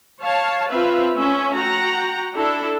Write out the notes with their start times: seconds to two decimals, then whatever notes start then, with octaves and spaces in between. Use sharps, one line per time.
0.22 C#5 F5 A5
0.69 C4 F4 B4 E5 F5
1.16 A3 C#4 E5
1.55 F#4 F#5 G5 A#5
2.35 D4 E4 A4